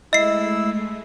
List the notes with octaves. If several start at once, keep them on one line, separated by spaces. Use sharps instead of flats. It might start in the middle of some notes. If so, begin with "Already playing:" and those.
G#3 A3 E4 D#5 E6 C7